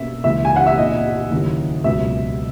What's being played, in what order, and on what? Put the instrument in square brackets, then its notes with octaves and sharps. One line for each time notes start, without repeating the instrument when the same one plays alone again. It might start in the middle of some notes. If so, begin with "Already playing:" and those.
Already playing: [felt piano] B2 A#3 C#4 [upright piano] E5
[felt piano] C#2 C#3 E3 A#3 [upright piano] E5
[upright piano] G#5
F#5
E5
[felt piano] A#2 A#3 D#4 [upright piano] D#5
[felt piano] D#2 C#3 F#3 C#4 E4
[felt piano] C#2 B2 F#3 [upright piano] E5